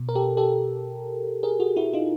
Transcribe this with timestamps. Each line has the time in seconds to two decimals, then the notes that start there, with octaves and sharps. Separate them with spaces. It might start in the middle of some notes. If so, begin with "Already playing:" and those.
Already playing: B2
0.09 A#4
0.15 G4 A4
0.37 G4 A4
1.43 G#4 A#4
1.60 F#4 G#4
1.76 E4 F#4
1.93 D#4 F4